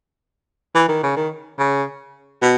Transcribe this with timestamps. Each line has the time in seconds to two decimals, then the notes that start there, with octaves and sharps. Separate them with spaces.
0.75 E3
0.89 D#3
1.03 C#3
1.16 D#3
1.59 C#3
2.42 B2